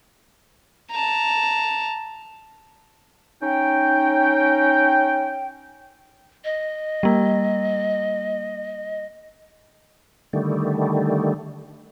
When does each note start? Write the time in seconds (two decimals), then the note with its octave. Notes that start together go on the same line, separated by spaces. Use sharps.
0.91 A5 A#5
3.42 C#4 D#4 G5
6.45 D#5
7.03 G3 A#3
10.33 D3 D#3 G3 A3